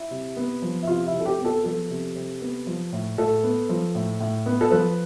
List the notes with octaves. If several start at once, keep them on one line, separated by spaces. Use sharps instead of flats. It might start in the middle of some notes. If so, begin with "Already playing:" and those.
Already playing: E4
C3
B3
F3
E4
C3 F4
E4
C3
A4
G4
B3
A4
F3 A4
C3
C3
B3
F3
A2
A2 A4
B3
F3
A2
A2
B3
A4
F3 B4